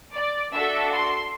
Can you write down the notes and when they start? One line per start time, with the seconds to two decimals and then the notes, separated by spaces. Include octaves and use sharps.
0.14 D5
0.53 D4 F#4 A4 E5
0.92 C6